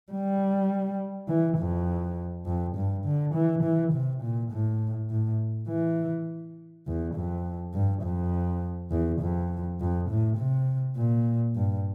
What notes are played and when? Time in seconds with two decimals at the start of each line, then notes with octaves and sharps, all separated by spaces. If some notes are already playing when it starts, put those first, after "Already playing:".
0.12 G3
1.28 E3
1.58 F2
2.46 F2
2.76 G2
3.05 D3
3.35 E3
3.63 E3
3.93 C3
4.23 A#2
4.51 A2
5.10 A2
5.68 E3
6.87 E2
7.15 F2
7.74 G2
8.04 F2
8.91 E2
9.21 F2
9.80 F2
10.10 A2
10.38 C3
10.97 A#2
11.56 G2